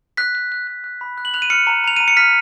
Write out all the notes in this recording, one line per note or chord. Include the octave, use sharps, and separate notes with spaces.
F#6 B6
F#6
F#6
F#6
F#6
B5
F#6
F#7
F#6 F7
D#7
F6 C#7
A#5
A#5 F7
A#5 D#7
C#7
F6 B6